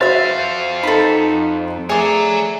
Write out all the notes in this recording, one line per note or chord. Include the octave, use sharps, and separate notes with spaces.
F2 F#4 C5 E5 F5 B5 A6
D#4 A4 B5
A3 G#4 C#5 D5 A#5